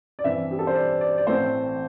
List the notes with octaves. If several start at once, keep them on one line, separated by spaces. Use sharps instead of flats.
D5
G2 E3 C4 E5
G4
A4
C5
D5
D5
D5
A1 A2 E3 A3 C4 C5